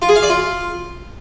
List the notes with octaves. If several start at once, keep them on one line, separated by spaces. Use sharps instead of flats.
F4
G#4
F5
D5
F4